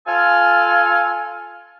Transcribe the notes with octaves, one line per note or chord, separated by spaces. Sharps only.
F4 A4 G#5 F6